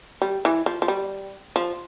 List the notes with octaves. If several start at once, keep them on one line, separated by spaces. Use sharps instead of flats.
G3
E3
F3
F3
G3
F3